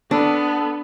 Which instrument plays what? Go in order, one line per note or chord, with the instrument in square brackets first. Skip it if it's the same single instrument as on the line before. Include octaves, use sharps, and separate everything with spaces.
[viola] B3 [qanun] D4 [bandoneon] A4